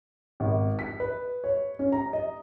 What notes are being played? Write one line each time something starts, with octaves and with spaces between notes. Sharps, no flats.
G#1
B6
B4
C#5
C#4
A#5
D#5